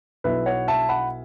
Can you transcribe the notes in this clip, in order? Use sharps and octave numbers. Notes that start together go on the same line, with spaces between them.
B1 B2 B3 E4 B4 E5
C#5 F#5
E5 A5
F#5 B5